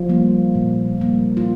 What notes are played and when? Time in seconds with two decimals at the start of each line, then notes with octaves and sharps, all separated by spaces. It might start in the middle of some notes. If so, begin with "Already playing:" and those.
Already playing: F3 F4
0.09 G3 A#3
0.55 A#2
1.00 G3 A#3
1.37 F4